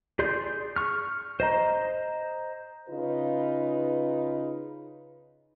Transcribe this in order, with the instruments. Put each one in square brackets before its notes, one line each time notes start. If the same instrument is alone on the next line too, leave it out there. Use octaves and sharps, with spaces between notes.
[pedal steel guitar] G#4 D5 C6 G6
C#6 F6
C5 D#5 A#5
[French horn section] C#3 D#4 F4 B4